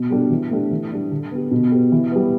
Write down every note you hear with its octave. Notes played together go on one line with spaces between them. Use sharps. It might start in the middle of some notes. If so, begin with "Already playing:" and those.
Already playing: B2
G3 D4 G4
E3
A3 D4 G4
E3
G3 D4
D3
B3 G4
B2
B3 G4
E3
G3 B3